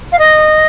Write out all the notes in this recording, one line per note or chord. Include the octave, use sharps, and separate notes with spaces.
F5
D#5